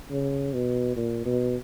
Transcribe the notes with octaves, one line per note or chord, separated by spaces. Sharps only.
C#3
B2
A#2
B2